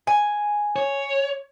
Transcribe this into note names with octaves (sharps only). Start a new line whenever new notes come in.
G#5
C#5